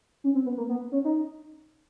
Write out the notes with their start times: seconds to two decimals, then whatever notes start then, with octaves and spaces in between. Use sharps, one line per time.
0.24 C#4
0.35 C4
0.46 B3
0.57 A#3
0.69 B3
0.92 C#4
1.04 D#4